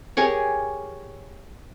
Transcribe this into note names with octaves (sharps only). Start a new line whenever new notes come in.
G4 G#4 A#4 C#5